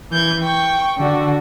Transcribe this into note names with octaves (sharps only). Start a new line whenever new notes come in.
E3 G6 G#6
G5 C#6
D3 F#4